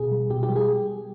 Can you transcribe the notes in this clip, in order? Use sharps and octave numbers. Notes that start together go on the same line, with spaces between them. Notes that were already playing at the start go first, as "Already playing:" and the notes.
Already playing: B2 G#4
G3
B2 G4
G4
G3
G#4